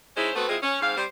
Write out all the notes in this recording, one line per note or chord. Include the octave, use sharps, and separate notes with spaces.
G#3 C#4 D#4 E4 C5
A3 B3 C4 F#4 B4
G#3 C4 E4 F4 G#4
C#4
G#2 C4 F5
G3 C4 C5